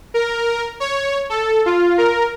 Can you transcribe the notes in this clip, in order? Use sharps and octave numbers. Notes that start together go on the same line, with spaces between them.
A#4
C#5
A4
F4
A#4